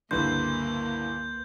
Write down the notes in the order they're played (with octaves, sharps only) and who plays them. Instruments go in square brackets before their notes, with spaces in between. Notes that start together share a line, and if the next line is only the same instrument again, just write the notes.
[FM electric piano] C#2 B4 C6 [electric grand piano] G2 D3 E3 [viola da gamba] A#3 [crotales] G6